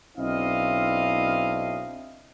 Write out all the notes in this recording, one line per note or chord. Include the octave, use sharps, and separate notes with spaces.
B1 C4 D4 E4 D#5 F5